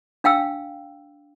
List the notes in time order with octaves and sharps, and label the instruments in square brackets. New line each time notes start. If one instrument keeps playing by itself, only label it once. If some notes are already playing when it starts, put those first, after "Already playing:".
[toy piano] D4 F5 G5 E6